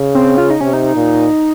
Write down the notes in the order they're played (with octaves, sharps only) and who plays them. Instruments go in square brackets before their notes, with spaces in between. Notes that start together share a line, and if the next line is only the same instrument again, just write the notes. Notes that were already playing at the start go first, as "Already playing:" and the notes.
Already playing: [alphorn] C#3
[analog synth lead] C4
F4
D#4
[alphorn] C3 [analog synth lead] C#4
[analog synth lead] D#4
[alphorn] A#2